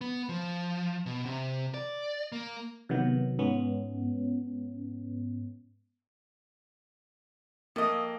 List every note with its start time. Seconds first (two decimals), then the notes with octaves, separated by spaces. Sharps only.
0.01 B3
0.29 F3
1.06 B2
1.25 C3
1.74 D5
2.32 A#3
2.89 C3 D#3 F#3 B3
3.39 G#2 B3 C#4
7.76 F2 A#3 D#5